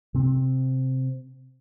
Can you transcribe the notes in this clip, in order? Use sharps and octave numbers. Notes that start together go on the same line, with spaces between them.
C3 C4